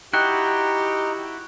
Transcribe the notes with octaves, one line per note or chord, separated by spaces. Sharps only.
D#4 E4 F#4 G4 G5 F#6